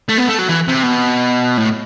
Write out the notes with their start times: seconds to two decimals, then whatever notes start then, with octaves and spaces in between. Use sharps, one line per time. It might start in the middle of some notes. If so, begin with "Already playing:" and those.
0.09 A3
0.18 B3
0.28 A3
0.38 F#3
0.48 E3
0.68 C3
0.83 B2
1.57 A2